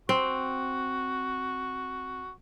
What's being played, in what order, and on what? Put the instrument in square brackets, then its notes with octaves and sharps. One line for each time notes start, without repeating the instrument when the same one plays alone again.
[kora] C4 [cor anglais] F#4